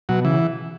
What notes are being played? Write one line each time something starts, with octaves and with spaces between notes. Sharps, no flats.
B2 F#3
C#3 E3